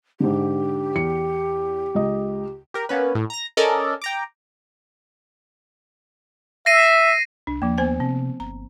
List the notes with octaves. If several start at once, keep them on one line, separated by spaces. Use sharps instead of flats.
G#2 D3 G4
E2 C#7
C#2 D#5
G4 A#4
A#3 B3 C#4 B4
A2
A#5 A#6
C#4 A4 A#4 D5 D#5
G5 A#5 D6
E5 A#6 C7 D#7
C2 D4
D#2 F3 A#3
B3 C5 G#5
C3 C4
G1 A#5